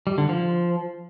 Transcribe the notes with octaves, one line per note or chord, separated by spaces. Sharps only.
G3
D3
F3